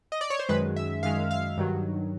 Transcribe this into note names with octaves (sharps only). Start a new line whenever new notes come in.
D#5
D5
C#5
C5
F#2 D#3 G#3 B4
E5
F#2 D#3 G#3 F5
F5
G2 D#3 F#3